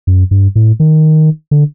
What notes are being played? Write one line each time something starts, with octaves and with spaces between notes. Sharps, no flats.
F#2
G2
A2
D#3
D3